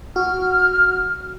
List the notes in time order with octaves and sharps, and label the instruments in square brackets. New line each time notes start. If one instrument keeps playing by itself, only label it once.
[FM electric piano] F#4 [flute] F6